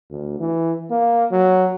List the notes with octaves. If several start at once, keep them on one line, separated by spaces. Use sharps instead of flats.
D2
E3
A#3
F#3